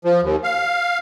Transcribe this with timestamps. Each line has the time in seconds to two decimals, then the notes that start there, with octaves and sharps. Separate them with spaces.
0.05 F3
0.22 D#2
0.44 F5